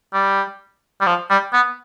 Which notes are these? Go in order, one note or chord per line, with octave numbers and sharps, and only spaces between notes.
G3
G3
F3
G3
B3